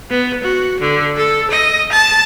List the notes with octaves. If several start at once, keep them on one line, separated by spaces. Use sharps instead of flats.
B3
F#4
D3
A4
D#5
A5